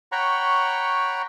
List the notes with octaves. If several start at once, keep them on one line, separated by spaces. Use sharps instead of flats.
C#5 F#5 G5 A#5 B5 C#6